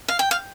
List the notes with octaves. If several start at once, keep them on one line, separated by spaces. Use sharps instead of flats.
F5
G5
F5